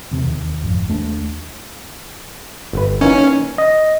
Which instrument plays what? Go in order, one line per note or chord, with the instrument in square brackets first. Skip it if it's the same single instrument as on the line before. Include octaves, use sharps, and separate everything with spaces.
[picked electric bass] E2 C3
D#2
G#1 F2
D#2 A3 D4
[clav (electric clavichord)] G1 B4
[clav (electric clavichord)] E3 A#3 D#4 [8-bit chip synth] C#4
[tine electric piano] D#5